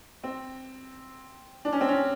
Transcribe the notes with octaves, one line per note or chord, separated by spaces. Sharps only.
C4
D4
C#4
C4
C#4